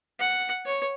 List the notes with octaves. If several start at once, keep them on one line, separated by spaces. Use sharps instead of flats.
F#5
C#5